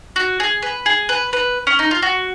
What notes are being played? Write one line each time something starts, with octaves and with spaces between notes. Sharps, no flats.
F#4
G#4
B4
G#4
B4
B4
C#4
D#4
F4
F#4